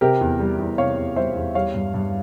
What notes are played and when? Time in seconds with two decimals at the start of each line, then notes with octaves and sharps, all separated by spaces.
0.01 C3 G4 A#4
0.21 E2
0.40 G3
0.59 E2
0.78 C3 C#5 F5
0.98 E2
1.16 G3 C5 E5
1.36 E2
1.55 G3 C#5 F5
1.74 G2
1.94 G2